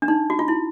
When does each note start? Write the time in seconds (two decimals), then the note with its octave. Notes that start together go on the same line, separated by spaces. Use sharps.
0.02 D4
0.08 D#4
0.30 F#4
0.39 F4
0.48 E4